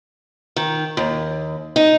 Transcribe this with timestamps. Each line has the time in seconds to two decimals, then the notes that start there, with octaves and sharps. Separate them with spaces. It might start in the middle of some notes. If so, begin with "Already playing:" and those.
0.56 D#3
0.97 D#2
1.76 D#4